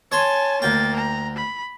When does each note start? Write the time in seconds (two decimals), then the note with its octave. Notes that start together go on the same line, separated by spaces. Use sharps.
0.12 C#5 G#5 A5 C6
0.62 D2 A#3 G5 A6
0.96 A#5
1.36 B5